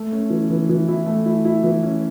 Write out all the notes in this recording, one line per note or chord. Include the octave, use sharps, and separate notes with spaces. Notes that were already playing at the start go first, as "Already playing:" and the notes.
Already playing: A3
C#4
E3
E3
E3
E4
A3
E4
E4
E3
C#4